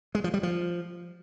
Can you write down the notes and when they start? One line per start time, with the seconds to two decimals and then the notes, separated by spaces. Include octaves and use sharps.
0.15 G#3
0.24 F3
0.34 G3
0.43 F3